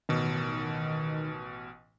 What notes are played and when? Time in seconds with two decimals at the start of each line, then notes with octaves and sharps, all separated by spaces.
0.09 A1 B2 D#3